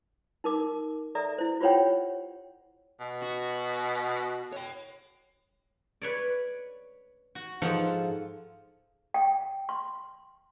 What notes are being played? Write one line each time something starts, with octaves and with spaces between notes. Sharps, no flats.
D#4 A#4 D6
A4 D5 E5 A#5
E4 C5
F4 G4 C5 C#5 F#5 G5
B2
F#4
C#5 G5
B4 C#5 D5
F#4
G#2 F3 F4 A4 F#5
G5
C6